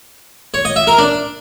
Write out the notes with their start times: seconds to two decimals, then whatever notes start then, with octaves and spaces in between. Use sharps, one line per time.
0.54 C#5
0.65 D#5
0.76 E5
0.87 A#4
0.98 D4